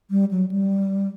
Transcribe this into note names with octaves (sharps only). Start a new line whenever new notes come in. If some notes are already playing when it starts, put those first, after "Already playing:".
G3
F#3
G3